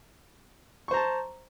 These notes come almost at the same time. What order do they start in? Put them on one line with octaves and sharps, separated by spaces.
C#6 C5 A#5 A5